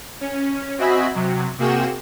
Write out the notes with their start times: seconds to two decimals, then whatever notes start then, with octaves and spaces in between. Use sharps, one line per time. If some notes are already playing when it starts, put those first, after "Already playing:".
0.21 C#4
0.78 C4 F#4 D#5 E5 G#5 B5
1.15 C3 F#3
1.58 C3 A#3 F#4 G#4 G5 E7